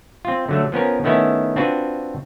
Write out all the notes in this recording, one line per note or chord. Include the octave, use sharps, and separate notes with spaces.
C4 F4
D3 F#3 A3
F3 B3 C#4 A#4
D#3 A3 B3 C#4 E4
C4 D4 F4 F#4 B4